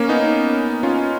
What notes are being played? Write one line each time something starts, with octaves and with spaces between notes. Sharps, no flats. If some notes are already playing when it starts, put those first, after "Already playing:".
Already playing: A#3 C#4
B3 D#4
C#4 F4